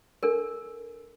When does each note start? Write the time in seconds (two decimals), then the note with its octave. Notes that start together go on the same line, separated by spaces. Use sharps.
0.23 D4 A4 A#4